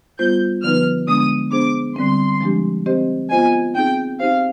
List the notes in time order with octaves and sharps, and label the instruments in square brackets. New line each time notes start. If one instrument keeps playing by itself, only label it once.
[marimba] G3 B3 F4 C5 [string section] G6
[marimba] D3 F3 B3 D#4 B4 [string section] F6
[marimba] D3 G#3 B3 D4 [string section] D#6
[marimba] B3 D4 G#4 C5 [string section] D6
[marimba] D3 G3 C4 [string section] C6
[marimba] F3 G#3 D4 G4
C4 G4 C5 D#5
[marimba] B3 F4 C5 D#5 [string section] G#5
[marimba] C4 D#4 G#4 [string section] G5
[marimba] C4 D#4 G4 C5 [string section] F5